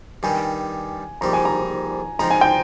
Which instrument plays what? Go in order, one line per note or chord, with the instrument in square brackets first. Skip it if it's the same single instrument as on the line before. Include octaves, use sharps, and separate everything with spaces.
[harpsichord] G2 D#3 G3 [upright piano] G#5
[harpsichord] A#1 G#2 G3 [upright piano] A#5
[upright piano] G#5
A#5
[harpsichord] F3 G#3 C4 D#4 [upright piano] A#5
[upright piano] G#5
G5